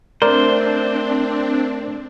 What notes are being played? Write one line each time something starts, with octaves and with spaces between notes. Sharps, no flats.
A3 C4 D4 A#4 C5 D5